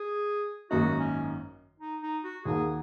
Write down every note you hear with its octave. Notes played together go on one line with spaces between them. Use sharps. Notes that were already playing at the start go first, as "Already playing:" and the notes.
Already playing: G#4
G#1 F#2 D#3 A#3 D#4 F#4
C#4
D#4
D#4
F#4
D#2 D#3 A#3 F#4 G#4